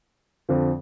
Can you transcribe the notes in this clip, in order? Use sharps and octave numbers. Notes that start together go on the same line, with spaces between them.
F2 D3 F3